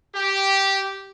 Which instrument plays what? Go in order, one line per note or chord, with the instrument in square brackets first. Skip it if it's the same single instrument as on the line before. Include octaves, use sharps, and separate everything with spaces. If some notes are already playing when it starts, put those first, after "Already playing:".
[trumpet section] G4